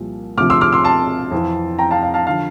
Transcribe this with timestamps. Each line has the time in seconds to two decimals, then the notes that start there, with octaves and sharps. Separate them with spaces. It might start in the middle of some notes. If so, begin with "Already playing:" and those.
Already playing: C2 A#2 F3
0.37 D2 C3 F3 D6 F6
0.50 C6 E6
0.61 D6 F6
0.73 C6 E6
0.84 A5 C6
1.32 F2 E3
1.79 G5 A#5
1.91 F5 A5
2.03 F5
2.14 F5 A5
2.27 D3 F3 F5 A5